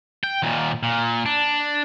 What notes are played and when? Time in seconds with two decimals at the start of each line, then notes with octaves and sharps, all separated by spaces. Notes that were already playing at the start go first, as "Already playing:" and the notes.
0.24 G5
0.42 D#2 A#2
0.83 A#2
1.26 D4